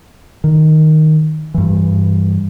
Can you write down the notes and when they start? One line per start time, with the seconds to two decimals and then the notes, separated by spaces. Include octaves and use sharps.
0.44 D#3
1.54 G2 E3